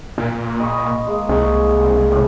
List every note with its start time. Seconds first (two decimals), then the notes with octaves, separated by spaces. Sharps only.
0.18 A#2
0.60 D#5 B5 C#6
1.07 G#3 A#3
1.29 C2 G#4 C#6
2.12 A2 C4 C#4